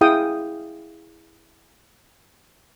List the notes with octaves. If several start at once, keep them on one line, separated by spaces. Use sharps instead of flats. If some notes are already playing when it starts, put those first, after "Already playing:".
E4 G#4 F5 G5 D#6